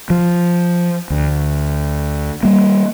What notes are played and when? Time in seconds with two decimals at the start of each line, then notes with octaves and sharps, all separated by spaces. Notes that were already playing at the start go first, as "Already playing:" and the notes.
0.10 F3
1.10 D2
2.43 G3 A#3